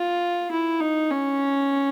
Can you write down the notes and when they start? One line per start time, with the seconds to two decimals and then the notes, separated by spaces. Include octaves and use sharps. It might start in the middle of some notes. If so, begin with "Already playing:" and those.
Already playing: F4
0.51 E4
0.80 D#4
1.10 C#4